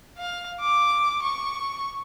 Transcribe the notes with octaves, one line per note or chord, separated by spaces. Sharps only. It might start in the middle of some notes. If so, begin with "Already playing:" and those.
F5
D6
C#6